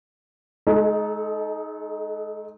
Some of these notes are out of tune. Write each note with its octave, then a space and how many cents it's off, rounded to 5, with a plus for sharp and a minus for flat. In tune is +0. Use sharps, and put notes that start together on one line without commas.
G#3 +35 D#4 +5 A4 -25